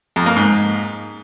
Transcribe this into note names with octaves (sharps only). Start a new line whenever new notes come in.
F2
A#3
G#2